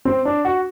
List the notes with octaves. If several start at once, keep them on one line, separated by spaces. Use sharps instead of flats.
C4
D4
F#4